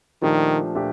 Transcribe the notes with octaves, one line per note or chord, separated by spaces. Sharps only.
A#2 D#3 F3 A3 D4 G4
A#2 F3 A3 D4 G4